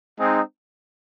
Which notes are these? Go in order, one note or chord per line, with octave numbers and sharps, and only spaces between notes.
G#3 C4 D#4